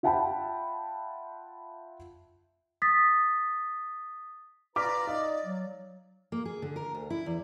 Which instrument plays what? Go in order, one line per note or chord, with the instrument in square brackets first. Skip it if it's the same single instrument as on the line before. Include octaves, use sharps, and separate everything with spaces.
[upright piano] F4 E5 F#5 G5 A5 B5
[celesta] D#6 A6 B6
[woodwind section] F4 B4 A#5 [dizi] D5 [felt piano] D6 F6 B6
[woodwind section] D#4 D#5 [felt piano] F5
[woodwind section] F#3
[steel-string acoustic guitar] A#3
G#4
D3
A#4
D2
E4
E2